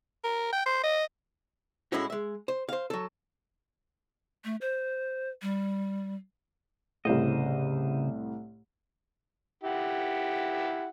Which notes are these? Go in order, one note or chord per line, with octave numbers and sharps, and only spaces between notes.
A#4
G5
C5
D#5
A2 G#3 C#4 E4 F#4
G#3 E5
C5
C5 F5
F#3 A4
A3
C5
G3
C2 A2 C#3 C5 D#5
E4 G4 F#5